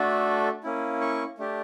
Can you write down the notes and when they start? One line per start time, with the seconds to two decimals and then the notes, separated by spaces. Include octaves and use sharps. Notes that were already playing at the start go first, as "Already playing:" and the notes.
Already playing: A3 D4 F#4 A4
0.64 A#3 C#4 E4
1.01 C#6
1.38 A3 D4 G4